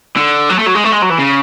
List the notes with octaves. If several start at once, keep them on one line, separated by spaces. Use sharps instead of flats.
D3
F#3
A3
F#3
G#3
A3
G#3
F#3
E3
C#3